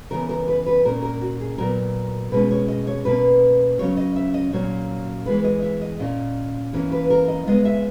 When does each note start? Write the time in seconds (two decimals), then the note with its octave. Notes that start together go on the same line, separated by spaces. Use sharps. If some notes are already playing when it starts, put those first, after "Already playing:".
0.11 C#3 E3 B3 A#4
0.29 A#4
0.48 B4
0.66 B4
0.84 A#2 A#3 C#4 A#4
1.02 A#4
1.21 F#4
1.40 G#4
1.58 A#2 F#3 B3 A#4
2.32 B2 G#3 C#4 B4
2.51 C#5
2.68 D#5
2.87 C#5
3.05 B2 A#3 C#4 B4
3.79 C#3 F#3 C#4 C#5
3.97 D#5
4.16 E5
4.34 D#5
4.53 A#2 F#3 A#3 C#4 C#5
5.26 E3 G#3 B3 B4
5.44 D#5
5.62 E5
5.81 D#5
5.99 A#2 A#3 C#4 D#5
6.73 E3 A#3 C#4 C#5
6.92 B4
7.10 A#4
7.28 D#5
7.46 C#3 G#3 B3 D#5
7.65 E5